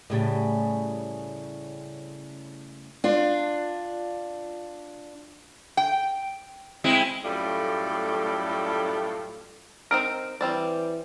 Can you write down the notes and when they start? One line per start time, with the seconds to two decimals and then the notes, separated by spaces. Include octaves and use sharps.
0.10 A2 C#3 G3
3.04 D4 F4
5.77 G5
6.84 G#3 C4 E4
7.25 F#2 A2 G3 A3 F4
9.91 C4 D#4 A#4 F6 D7
10.41 E3 G3 C4 D5